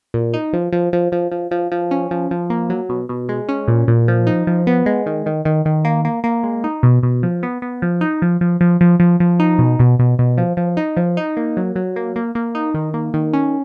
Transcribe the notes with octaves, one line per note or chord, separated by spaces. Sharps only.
A#2
D#4
F3
F3
F3
F3
F3
F3
F3
C#4
F3
F3
A#3
F#3
B2
B2
G#3
C#4
A#2
A#2
F3
D#4
F3
B3
G#3
D#3
D#3
D#3
D#3
A#3
A#3
A#3
G#3
D#4
B2
B2
F3
B3
B3
F3
D#4
F3
F3
F3
F3
F3
F3
D#4
B2
B2
B2
B2
F3
F3
D#4
F3
D#4
A#3
F#3
F#3
A#3
A#3
A#3
D#4
D#3
A#3
D#3
C#4